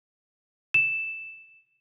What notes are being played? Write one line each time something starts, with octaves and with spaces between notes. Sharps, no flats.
E7